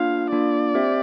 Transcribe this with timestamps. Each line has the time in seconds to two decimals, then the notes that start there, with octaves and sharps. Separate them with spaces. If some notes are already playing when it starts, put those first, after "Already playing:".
Already playing: A#3 D4 F4 F5
0.32 A#3 D4 F4 D5
0.74 C4 G4 C5 E5